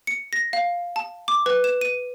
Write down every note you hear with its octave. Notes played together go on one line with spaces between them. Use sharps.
C#7
A#6
F5
A5
D6
B4
E7
D#7